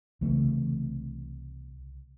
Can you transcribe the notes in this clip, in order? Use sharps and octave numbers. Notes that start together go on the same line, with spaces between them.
C2 C#3 E3 A3